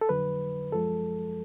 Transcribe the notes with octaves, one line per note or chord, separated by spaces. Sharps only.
A4
F2 D3 F#3 B4
F#2 F3 G#3 A4